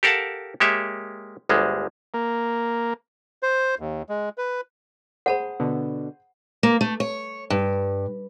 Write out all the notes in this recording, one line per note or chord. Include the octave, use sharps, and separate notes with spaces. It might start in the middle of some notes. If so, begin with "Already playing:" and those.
G4 A4 A#4 F5 F#5 A5
G#3 A#3 G4 C#5 E5
G1 D2 G3 G#3
A#3
C5
D#2
G#3
B4
G#4 C5 F#5 A5 B5
B2 D3
A#3
A3
C#5
G2